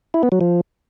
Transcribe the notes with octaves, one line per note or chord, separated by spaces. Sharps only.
E4
B3
F#3
F3